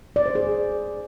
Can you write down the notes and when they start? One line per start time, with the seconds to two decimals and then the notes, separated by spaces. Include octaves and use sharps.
0.16 D5
0.26 C5
0.35 G#4